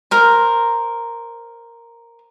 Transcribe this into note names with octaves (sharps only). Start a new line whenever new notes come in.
A#4 C5